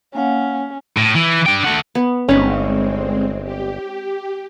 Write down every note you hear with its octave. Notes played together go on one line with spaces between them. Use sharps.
A#3 C#4 F5 F#5
A2
E3
D4 G5
A3 F#5
B3
G1 G#3 C4 C#4 D#4 B5
G4